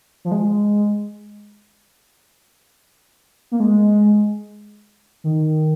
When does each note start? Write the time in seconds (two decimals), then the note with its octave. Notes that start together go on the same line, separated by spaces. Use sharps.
0.25 F3
0.32 G#3
3.52 A#3
3.60 G#3
5.24 D#3